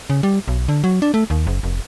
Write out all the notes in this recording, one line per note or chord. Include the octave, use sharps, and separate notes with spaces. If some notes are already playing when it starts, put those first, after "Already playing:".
C#3
G3
B1
D3
F#3
D4
A3
D#2
F#1
F1